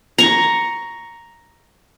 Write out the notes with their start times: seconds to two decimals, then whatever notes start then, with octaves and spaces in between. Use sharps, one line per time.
0.18 A#5 C#6